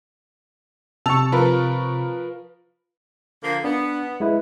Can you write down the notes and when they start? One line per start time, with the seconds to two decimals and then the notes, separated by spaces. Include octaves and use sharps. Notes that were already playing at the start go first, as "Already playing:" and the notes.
1.06 C3 A5 C#6 E6 F7
1.32 F3 A#4 B4
3.44 D3 F3 A#3
3.64 B3 D4
4.20 G#3 E4 B4